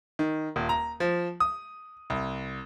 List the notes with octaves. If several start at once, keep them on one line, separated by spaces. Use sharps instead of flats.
D#3
D#1
A#5
F3
D#6
C2